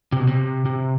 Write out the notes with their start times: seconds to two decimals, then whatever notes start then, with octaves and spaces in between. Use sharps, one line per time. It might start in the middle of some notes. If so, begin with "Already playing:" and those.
0.12 C3
0.20 B2
0.27 C3
0.66 C3